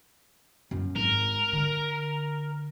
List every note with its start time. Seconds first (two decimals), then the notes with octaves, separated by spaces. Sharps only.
0.71 F#2 F#3
0.96 G#1 A#4
1.53 D3